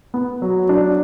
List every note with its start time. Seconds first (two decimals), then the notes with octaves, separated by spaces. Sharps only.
0.14 B3
0.42 F#3
0.69 D4